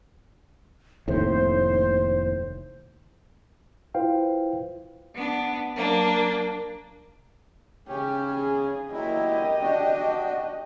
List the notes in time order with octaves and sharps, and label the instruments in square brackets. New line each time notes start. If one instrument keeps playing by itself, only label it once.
[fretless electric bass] F1 D#2 A2 [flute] C5
[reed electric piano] E4 F4 B4 C5 F5 G5
[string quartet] B3 D4
F#3 A#3 D4
[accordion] C#3 C#4 [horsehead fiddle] G4
[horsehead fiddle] G#4
[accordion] A#2 F#3 E4 [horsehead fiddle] G4 D#5
[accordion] D4 F#4